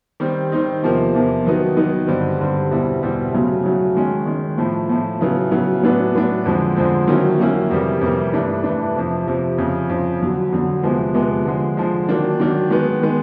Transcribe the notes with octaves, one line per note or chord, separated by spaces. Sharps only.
D#3 G3 C4 D#4
D#3 G3 C4 D#4
E2 C3 F3 A#3
E2 C3 F3 A#3
D#3 F#3 B3 D#4
D#3 F#3 B3 D#4
G2 D3 G3 C4
G2 D3 G3 C4
E2 B2 G3 C4 E4
E2 B2 G3 C4 E4
C#3 F#3 A3
C#3 F#3 A3
D#3 G#3 C#4
D#3 G#3 C#4
A2 F3 A3
A2 F3 A3
C#3 F#3 B3 E4
C#3 F#3 B3 E4
A2 F#3 B3 D4
A2 F#3 B3 D4
F2 D3 F3 G#3 C4
F2 D3 F3 G#3 C4
D#3 F#3 A#3 C#4 E4
D#3 F#3 A#3 C#4 E4
F2 C3 E3 G3 A#3
F2 C3 E3 G3 A#3
G2 E3 A3 D4
G2 E3 A3 D4
F2 C3 F3
F2 C3 F3
F2 C#3 F3
F2 C#3 F3
F2 D3 F#3
F2 D3 F#3
E2 C3 F3 G#3 B3
E2 C3 F3 G#3 B3
D3 F3 G#3
D3 F3 G#3
D#3 F#3 A#3 D4
D#3 F#3 A#3 D4
D#3 G#3 B3
D#3 G#3 B3